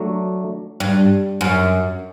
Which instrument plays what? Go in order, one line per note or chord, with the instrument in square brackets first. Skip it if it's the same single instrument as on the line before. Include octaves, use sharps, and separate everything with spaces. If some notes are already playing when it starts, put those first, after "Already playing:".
Already playing: [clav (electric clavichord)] F#3 A3 D4
[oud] G2
F#2